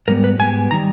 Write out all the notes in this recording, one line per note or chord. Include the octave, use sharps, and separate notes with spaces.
G#2 G3 B3 A#4
B4
G#2 G3 B3 G#5
D#3 G3 A#5